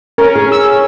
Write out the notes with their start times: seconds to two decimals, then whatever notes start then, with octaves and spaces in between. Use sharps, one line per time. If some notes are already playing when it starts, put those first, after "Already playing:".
0.18 C#4 A#4
0.35 G#4
0.52 E6